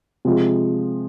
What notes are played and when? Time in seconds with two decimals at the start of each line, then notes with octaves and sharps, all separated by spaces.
0.25 C3 F3 G#3